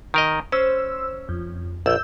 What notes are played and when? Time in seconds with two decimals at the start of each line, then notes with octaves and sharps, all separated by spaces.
0.14 D#3 A#4 D#5
0.52 C#4 C5 E6
1.29 F2
1.86 A#1 E6 G6